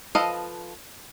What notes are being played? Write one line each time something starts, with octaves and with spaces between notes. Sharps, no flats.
F3 A4 B4 D#5 F5